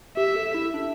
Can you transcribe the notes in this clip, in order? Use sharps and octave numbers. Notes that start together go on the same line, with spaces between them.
G4 E5
A4
E4
D4